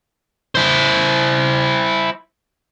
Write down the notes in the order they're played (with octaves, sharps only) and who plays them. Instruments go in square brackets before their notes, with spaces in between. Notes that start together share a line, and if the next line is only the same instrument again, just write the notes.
[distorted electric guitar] E4 C5